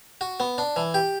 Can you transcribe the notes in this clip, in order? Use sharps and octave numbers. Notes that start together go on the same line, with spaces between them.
F#4
B3
D4
E3
G4